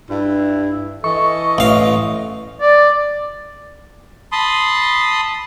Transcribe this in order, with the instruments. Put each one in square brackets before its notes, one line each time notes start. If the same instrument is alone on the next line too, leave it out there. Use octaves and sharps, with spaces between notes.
[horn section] G2 E4
[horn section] E3 A4 D#5 [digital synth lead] C#6
[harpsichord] A1 F5
[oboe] D5
[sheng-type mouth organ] A5 B5 C6 D#6